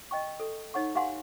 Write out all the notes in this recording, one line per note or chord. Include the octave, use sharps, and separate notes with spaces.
D#5 G5 C#6
A4
D#4 C#5 F#5 C#6
G4 F5 F#5 G#5 C6